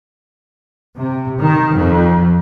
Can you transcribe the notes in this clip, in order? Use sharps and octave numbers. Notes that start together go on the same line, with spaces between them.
C3
D#3
F2